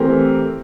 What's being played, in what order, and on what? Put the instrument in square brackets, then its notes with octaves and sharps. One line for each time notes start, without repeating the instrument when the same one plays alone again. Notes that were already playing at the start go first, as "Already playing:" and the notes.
Already playing: [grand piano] E3 A3 C4 G4 A#4